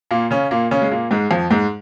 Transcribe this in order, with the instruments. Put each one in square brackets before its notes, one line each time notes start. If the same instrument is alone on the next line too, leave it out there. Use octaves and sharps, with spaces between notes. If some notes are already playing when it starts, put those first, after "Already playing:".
[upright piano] A#2 A#3
C#3 C#4
A#2 A#3
C#3 C#4
G#3
A#2 A#3
G#2 G#3
F2 F3
G#2 G#3